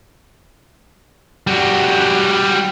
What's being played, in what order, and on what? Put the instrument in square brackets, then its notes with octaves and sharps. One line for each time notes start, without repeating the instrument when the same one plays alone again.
[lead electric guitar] G3 F#4